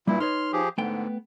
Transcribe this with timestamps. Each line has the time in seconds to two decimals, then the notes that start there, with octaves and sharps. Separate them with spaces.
0.07 G2 A#2 G3 A#3 E4
0.20 D#4 B4 C#5 C6 F6
0.53 F3 G4 G#4
0.78 G#2 D3 A3 B3 G5